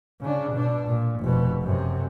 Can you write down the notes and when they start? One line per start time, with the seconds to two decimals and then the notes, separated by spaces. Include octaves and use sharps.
0.21 C#3 D4
0.52 B2 D4
0.88 A#2
1.20 F1 B2
1.63 F#2 C3